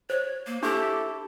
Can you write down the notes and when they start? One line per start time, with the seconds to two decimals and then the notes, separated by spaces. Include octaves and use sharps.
0.10 C5 C#5
0.46 A#3
0.63 D4 E4 G4 A4 C#6 G6